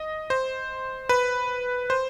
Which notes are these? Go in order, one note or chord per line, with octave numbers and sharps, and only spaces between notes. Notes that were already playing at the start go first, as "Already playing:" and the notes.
Already playing: D#5
C5
B4
C5